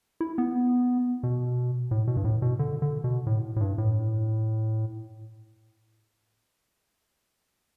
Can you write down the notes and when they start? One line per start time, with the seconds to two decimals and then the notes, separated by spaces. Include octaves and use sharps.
0.21 E4
0.38 B3
1.23 B2
1.91 A2
2.07 B2
2.17 G2
2.24 A2
2.42 B2
2.59 D3
2.82 D3
3.04 B2
3.27 A2
3.56 A2
3.61 G2
3.78 A2